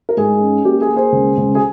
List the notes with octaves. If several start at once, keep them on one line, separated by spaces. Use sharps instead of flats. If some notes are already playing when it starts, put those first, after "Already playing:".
A#4
G#2 G#4
C#4
A#3 G4
G#4
A#3
G#4 C5
C#2
C#2
G#4